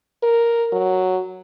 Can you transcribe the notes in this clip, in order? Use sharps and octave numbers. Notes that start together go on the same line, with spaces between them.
A#4
F#3